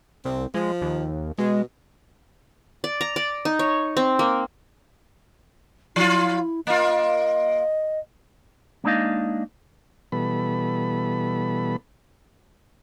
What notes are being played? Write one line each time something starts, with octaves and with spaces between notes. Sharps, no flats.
C2 C4
F3 G#3
D#2
B2 G#3
D5
A#5
D5
D#4
C#5
C4
A#3
F3 E4 F4
A#3 F4 D#5
G#3 A#3 D4 D#4 D#5 F5
B2 E3 G3 B3 A4 B5